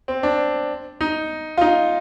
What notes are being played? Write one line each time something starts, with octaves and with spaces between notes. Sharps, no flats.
C4
D4
D#4
F4
D#4